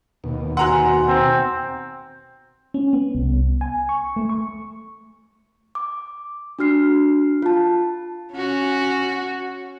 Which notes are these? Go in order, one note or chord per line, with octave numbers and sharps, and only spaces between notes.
D#2 B2
F#4 F#5 G#5 A#5 C6 F#6
C4
C#4
B3
C2
G#5
C#6
A3
C#6
D6
D4 F#4 F6 C7
F4 A5
C#4 F#4